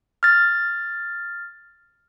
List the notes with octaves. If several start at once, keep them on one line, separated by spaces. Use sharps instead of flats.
F6 A6